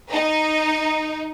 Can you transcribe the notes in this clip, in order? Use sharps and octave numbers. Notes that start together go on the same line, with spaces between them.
D#4